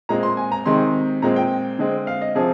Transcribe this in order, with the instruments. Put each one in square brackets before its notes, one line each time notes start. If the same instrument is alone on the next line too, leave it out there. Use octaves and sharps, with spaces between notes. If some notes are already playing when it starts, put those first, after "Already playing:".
[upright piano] A#2 G#3 C4 A#5
C6
G#5
A#5
C3 D#3 G#3 C4 C6
A#2 G#3 C4 A#5
G5
D3 G#3 C4
F5
D#5
C3 F3 C4 G#4